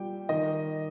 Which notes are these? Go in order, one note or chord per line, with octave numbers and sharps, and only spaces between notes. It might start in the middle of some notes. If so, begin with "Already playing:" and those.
Already playing: A#2 G3 G5
D#3 D#5